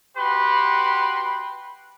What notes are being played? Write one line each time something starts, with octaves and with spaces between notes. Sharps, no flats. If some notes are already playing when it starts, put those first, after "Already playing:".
F#4 G4 B4 C6